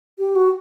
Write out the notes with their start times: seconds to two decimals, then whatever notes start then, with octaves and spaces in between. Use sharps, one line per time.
0.19 G4
0.36 F#4